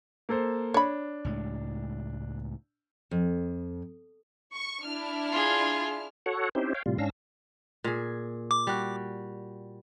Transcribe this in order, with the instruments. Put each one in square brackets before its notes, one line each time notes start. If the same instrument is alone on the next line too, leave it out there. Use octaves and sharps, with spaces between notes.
[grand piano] A#3 A4 C5
[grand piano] D4 [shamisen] C#5 B5
[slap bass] C#2 A2 G#3
[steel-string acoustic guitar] F2
[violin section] C#6
D4 E4 F6
[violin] F4 G#4
[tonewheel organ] F#4 A4 C#5 F#5
C4 C#4 D#4 E4 G4 C5
C#5 F5 G5
A2 C3 G3 F4
G#2 C#4 D4 F5 E6 A#6
[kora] A#2 G#4
[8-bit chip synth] D6
[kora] G3 F#4